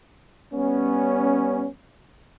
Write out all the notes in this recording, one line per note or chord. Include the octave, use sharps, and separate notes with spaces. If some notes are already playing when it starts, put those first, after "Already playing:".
G3 B3 C#4